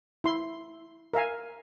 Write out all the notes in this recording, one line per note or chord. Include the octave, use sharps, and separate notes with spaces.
E4 C6
A#4 E5 F5 G#5